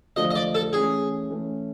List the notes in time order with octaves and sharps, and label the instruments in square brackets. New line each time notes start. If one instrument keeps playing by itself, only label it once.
[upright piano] D3 F3 A3 D4 F4 [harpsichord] D#5
[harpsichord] D#5
D5
A4
[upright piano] E3 A3 C#4 [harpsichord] G#4
[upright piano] E3 A3 C#4